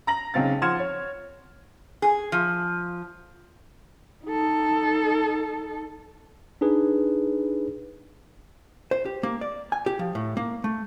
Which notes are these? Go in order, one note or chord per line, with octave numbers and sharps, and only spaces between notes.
A#5 A#6 F#7
B1 C#3 C4 F5 A6
F3 F#5 C6 F6 G#6 E7
C#5
G#4
F3
D#4 A4
D4 D#4 G#4 B4
C5
G4
A#3
D5
G#5
G4
F3
A2
A#3
A3